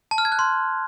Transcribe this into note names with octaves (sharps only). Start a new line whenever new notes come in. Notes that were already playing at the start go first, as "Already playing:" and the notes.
A5
F6
G#6
F#6
C6